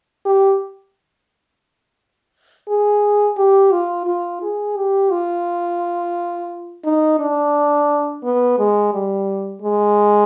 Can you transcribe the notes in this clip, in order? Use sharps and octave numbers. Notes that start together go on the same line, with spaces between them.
G4
G#4
G4
F4
F4
G#4
G4
F4
D#4
D4
B3
G#3
G3
G#3